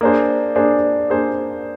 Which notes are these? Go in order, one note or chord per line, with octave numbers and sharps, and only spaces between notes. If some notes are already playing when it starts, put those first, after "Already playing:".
A#3 D4 G#4 C5
A#3 D4 G#4 C5
A#3 D4 G#4 C5